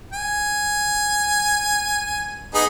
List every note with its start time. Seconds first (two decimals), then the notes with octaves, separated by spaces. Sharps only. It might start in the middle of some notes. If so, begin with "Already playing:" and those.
0.13 G#5
2.54 B3 D#4 G#4